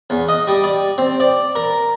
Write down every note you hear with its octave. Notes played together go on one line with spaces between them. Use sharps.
E2
D#5
G3
D5
C4
D5
A#4